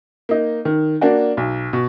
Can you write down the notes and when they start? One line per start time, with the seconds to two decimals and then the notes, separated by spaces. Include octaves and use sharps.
0.29 A#3 D#4
0.65 D#3
1.01 A#3 D4 F#4
1.37 B1
1.73 B2